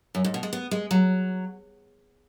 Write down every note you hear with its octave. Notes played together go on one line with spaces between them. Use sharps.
F#2
G#2
B2
G#3
B3
G#3
F#3